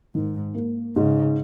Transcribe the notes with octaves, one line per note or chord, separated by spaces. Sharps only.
G#2 D#3
A#3
G#2 C#3